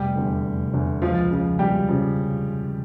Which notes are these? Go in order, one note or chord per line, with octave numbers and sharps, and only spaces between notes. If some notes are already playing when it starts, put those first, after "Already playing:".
Already playing: F1 G3 G4
E2 D3
F1
E2 D3
C#2 F3 F4
C#3 F3
C#2 G3 G4
C#3 F3